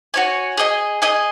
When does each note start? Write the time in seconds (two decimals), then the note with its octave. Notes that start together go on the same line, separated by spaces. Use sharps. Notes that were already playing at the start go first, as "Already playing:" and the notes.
0.14 F#4 C#5 G#5
0.57 G#4 D#5 G#5
1.02 G#4 D#5 G#5